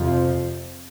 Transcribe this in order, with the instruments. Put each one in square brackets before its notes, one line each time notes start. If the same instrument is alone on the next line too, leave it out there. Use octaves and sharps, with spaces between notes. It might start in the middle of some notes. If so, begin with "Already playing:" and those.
Already playing: [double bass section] F2 C3 F3